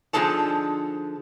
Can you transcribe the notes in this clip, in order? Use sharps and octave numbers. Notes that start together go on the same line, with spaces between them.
D3 F3 D#4 G#4 A4 A5